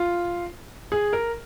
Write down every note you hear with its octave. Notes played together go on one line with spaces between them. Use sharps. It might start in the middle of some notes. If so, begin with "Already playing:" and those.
Already playing: F4
G#4
A#4